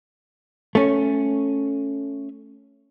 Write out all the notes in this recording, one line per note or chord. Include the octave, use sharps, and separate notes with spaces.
A3 C#4